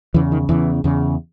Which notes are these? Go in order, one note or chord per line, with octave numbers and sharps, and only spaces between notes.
E2 C#3 E3
D#3
E2 C#3 E3
E2 C#3